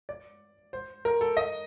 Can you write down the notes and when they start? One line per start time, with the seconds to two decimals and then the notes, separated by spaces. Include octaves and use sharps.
0.09 D5
0.73 C5
1.05 A#4
1.21 A4
1.37 D#5